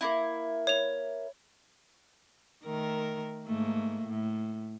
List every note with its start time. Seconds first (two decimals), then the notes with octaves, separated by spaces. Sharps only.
0.01 A#3 D#4 E4
0.67 C#5 F7
2.65 D#3 A3 A#4
3.45 G#2 A3 A#3
4.07 A2